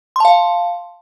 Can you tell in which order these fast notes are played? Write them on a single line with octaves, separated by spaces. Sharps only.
C6 A5 F5